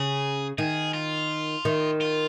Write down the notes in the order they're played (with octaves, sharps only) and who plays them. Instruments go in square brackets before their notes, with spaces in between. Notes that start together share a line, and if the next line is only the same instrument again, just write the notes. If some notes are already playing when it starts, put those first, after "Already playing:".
Already playing: [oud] C#3 [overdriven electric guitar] G#4
[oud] D#3 [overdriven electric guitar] G#4
[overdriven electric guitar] F4
[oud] D#3
[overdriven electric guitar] F4